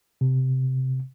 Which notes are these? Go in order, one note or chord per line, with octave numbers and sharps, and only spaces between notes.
C3